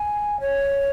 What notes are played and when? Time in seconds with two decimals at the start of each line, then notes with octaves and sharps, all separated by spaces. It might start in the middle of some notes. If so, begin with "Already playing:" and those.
Already playing: G#5
0.41 C#5